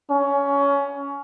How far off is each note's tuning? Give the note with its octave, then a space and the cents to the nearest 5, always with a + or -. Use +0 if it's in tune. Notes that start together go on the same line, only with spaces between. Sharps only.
C#4 +20